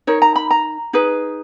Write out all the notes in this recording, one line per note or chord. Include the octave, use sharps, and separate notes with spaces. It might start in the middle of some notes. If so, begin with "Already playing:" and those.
D#4 A#4 C#5
A#5
B5
A#5
D#4 G#4 B4